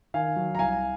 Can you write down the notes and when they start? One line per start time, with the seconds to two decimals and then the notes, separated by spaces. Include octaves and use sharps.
0.14 D#3 F5 G#5
0.36 F#3
0.55 A#5
0.59 C2 F5 G#5